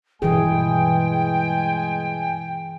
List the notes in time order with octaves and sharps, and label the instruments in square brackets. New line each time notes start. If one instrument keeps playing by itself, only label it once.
[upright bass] G2 B2 [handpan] E3 E4 G#4 [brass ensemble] G#3 G#5 [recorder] G5